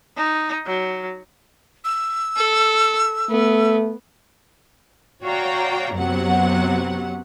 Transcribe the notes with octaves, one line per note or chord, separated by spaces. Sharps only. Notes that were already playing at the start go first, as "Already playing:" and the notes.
D#4
F#3
E6
A4
A3 B3
F#4 C#5 D5 F5 G5 A#5
F#2 C3 F#3 B3 F#5